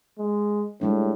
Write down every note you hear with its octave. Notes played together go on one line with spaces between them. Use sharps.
G#3
A2 G3 G#3 D4